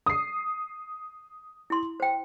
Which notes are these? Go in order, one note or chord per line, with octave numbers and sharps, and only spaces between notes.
D#6 C7
E4 C6
C5 G5